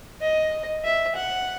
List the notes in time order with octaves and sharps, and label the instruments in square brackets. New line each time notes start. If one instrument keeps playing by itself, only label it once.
[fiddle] D#5
E5
F#5